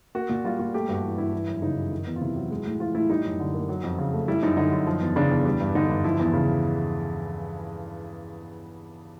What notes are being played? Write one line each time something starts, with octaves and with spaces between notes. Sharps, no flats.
A#3 F#4
A#2
G3 F4
A#2 F#4
A3 G4
G2 F#4
E3
G2 E4
E3
F#2
C#3 D#4
F#2
D#3
E2
F4
C3 E4
F#3
G#3
A2
E3 F4
A2 E4
G3 D#4
F#2
D3
A#3
F#3
F2
C#3
A3
G3 E4
F#2 D#4
D3 D#4
F#2
F3
E2
C#3 D4
E2
G3
G2
D3 D#4
G2
F3 E4
E2
C#3